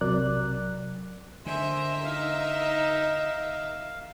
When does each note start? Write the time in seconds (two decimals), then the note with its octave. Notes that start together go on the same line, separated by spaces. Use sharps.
0.01 B1 C3 F#3 A#4 D5 F#6
1.46 D3 A#4 C5 D#5 E5 G#5
2.04 D#4 F5